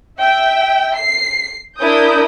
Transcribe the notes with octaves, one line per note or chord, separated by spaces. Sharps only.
E5 G5
C7
D4 E4 A#4 D#6 G6